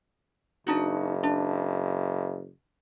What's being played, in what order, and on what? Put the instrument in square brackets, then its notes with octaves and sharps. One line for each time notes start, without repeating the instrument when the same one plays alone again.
[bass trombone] F#1 [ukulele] D4 D#4 F#4
[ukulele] D4